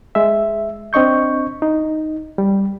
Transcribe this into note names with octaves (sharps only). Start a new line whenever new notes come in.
G#3 E5
C4 D4 D#5 C#6 G6
D#4
G3